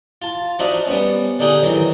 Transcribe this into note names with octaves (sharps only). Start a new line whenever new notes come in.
F4 A5
F3 D4 D#4 F#4 E5 F5
G3 B3 C#4
D3 D4 D#4 G4 G#4
D#3 E3 F#3